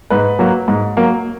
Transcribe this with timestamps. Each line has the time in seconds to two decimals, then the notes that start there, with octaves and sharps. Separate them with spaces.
0.10 G#2 B4
0.39 F#3 A#3
0.68 G#2
0.97 F#3 A#3